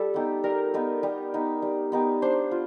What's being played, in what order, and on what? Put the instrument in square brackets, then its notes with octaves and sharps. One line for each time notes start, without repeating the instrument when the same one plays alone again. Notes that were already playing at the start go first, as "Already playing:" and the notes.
Already playing: [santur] G3 [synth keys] A4
[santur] B3 D#4 G4
[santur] G3 [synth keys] A#4
[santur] B3 D#4 G4
G3
B3 D#4 G4
G3
B3 D#4 G4
[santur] D4 [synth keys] C5
[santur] F4